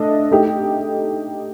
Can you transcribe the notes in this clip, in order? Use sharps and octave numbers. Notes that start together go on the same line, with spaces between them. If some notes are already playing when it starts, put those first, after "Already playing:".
Already playing: A3 D4 A4 D#5
A3 D#4 G4